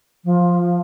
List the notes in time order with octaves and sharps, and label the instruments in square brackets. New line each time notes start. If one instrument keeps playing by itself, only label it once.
[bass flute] F3